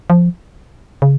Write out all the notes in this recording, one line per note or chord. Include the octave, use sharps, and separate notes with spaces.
F3
C#3